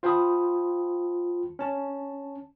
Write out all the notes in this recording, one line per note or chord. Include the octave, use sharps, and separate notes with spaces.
F4 C5 G5 A5 B5 D#6
C#4 A5